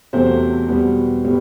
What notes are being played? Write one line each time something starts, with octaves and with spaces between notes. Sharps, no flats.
E2 C3 F#3 A3 C4 C5
E2 B2 G3 B3
A2 G3 B3